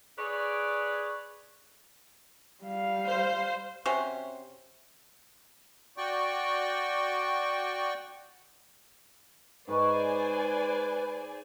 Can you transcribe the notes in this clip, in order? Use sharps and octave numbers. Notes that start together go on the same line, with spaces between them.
G#4 B4 C#5 D5
G3 F5
C5
C3 C#4 F#4 C5
F#4 D5 G5 C#6
G#2 B4 C5 D5 G#5 C#6